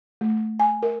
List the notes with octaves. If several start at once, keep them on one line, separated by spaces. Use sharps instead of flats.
A3
G#5
A#4